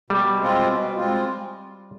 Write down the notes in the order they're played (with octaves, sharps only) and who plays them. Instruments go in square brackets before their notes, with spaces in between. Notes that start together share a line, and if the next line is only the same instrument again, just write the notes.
[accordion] B2 [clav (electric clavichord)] G3
[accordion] G#3 C4 F4
B2
G#3 C4 F4